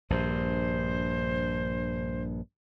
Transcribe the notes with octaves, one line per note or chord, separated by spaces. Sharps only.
A#1 G2 C5